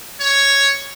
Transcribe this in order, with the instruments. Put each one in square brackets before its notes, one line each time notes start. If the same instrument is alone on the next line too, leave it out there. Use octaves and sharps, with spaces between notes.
[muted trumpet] C#5